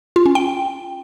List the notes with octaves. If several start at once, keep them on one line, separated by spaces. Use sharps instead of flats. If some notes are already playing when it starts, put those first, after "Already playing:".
F4
C#4
G5